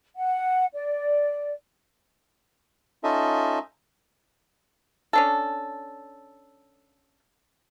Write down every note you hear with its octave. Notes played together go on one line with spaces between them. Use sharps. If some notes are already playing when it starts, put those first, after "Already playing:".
F#5
D5
C#4 D#4 F4 A4 D#5 E5
C#4 D4 A4